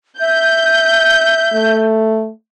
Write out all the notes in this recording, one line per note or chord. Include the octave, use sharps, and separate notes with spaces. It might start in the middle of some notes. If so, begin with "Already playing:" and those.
E5 G6
A3